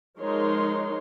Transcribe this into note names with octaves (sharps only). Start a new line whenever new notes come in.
F3 G#3 D#4 A#4 C#5 C6